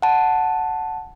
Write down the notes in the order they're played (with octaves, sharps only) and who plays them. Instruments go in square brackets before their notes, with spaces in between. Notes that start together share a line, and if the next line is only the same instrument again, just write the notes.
[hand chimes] F#5 A5